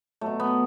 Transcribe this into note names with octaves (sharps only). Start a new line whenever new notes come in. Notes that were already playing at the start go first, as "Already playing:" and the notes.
B2 F#3 A3
B3